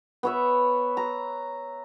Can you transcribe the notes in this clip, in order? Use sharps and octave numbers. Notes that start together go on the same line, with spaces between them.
B3 C#5 E5
A#5